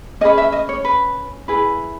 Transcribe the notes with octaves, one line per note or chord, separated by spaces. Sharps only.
C#4 G#4 B4 D#5
E5
D#5
C#5
B4
E4 G#4 B4